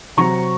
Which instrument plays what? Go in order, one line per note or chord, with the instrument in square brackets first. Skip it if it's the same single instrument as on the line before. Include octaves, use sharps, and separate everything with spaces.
[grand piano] C3 F#3 C4 A#5 C#6